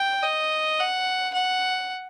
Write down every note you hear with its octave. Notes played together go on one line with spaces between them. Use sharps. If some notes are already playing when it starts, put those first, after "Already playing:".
Already playing: G5
D#5
F#5
F#5